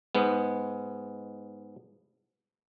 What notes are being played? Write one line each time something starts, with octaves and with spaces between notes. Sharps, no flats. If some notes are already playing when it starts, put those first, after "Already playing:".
G#2 G#3 B3